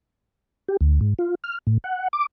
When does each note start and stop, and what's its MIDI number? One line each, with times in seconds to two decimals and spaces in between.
0.68 0.77 67
0.81 0.99 38
1.01 1.14 44
1.19 1.35 65
1.44 1.58 89
1.67 1.78 45
1.84 2.08 78
2.13 2.26 86